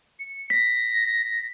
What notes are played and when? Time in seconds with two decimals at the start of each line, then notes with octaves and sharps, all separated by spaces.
0.19 C#7
0.50 A#6 B6